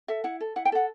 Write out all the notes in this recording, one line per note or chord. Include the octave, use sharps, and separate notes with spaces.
A4 E5
E4 F#5
A4
E4 F#5
G5
A4 F#5